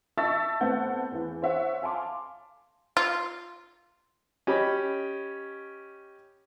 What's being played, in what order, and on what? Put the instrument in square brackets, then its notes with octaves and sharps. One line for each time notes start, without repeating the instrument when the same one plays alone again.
[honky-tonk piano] D#5 E5 A5 C#6 E6 A6
A2 B3 C4 F#5 A5 G6
E2 E3
C5 C#5 E5 F#5
F5 G#5 A5 C6 D6
[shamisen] F4
[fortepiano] C#4 G4 D#5 B5